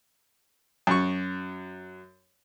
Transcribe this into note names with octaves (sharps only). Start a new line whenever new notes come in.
F#2 C#6